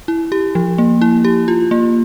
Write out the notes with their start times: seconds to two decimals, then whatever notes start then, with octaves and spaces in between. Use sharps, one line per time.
0.08 E4
0.32 G4
0.55 F3
0.78 A#3
1.02 E4
1.25 G4
1.48 F4
1.71 A#3